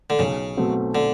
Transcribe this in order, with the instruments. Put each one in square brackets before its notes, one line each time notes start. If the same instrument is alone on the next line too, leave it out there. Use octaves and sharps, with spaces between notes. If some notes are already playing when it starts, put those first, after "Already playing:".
[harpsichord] D3
[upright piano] B1 [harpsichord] C#3
[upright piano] B2 F#3 A3 C4
[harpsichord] D3